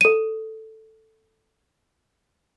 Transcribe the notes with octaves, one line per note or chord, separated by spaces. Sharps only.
A4 D#7